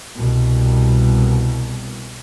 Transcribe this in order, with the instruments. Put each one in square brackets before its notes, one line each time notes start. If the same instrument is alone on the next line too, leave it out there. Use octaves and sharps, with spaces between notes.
[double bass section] C2 B2